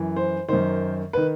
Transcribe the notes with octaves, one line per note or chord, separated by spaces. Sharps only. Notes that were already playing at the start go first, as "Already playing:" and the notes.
Already playing: F#2 E3
C5
F#2 D#3 C5
D#3 B4